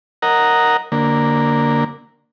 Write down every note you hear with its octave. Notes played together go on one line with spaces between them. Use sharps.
A#4 D#5 F#5 A#5
D3 A#3